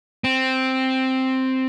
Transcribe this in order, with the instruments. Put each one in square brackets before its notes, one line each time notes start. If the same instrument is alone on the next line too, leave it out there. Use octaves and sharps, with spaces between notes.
[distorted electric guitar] C4